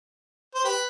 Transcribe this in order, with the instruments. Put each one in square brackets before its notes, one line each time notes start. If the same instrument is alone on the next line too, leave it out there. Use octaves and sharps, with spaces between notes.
[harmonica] C5
G4 B4